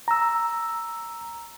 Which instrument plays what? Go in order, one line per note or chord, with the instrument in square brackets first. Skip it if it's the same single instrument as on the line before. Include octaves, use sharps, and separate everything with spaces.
[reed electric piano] A#5 E6